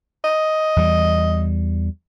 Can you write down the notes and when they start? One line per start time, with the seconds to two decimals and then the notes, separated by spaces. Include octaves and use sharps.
0.24 D#5
0.76 E2 G3